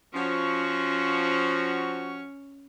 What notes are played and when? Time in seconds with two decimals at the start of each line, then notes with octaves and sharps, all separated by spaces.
0.14 F3 C#4 F#4 C#6